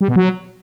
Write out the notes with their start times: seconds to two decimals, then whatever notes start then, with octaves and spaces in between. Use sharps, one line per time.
0.01 G3
0.08 B2
0.16 F#3